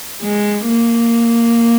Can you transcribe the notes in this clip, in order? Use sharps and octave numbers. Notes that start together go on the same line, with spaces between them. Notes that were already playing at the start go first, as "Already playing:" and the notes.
G#3
A#3